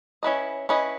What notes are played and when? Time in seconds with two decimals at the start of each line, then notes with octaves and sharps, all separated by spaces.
0.23 C#4 E4 B4 D#5
0.69 C#4 E4 B4 D#5